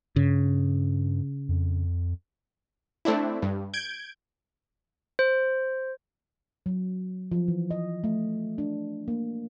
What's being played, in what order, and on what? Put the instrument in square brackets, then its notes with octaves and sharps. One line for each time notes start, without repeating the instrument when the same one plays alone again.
[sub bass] G2 [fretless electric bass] C#3
[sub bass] F2
[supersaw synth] A3 C4 D4 E4
G2
G6 G#6 D7
[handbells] C5
[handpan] F#3
F3
E3
D#5
A3
D4
A#3